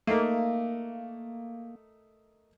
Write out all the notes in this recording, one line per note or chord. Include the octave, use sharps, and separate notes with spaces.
A3 A#3 D#4 A#4